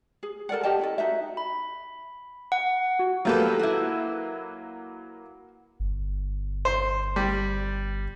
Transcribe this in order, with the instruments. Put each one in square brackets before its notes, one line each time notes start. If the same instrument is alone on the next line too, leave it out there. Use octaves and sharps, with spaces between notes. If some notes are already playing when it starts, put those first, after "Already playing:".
[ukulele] G#4
A4 A#4 D5 F#5
G4 D#5 G5 A5
C#4 E4 A4
D#4 F#4 E5
[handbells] B5
F#5
F#4
[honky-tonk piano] F#3 A#3 B4 [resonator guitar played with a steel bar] F4 G4 A4
[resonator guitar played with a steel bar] E4 F#4
[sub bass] G1
[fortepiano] C5
G3